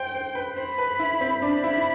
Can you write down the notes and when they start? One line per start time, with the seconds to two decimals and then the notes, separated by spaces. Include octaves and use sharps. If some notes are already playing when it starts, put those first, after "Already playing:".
Already playing: C5 G5
0.15 C5
0.35 B4
0.57 C5 B5
0.78 B4
0.99 E4
1.21 C4
1.42 D4 B5
1.64 E4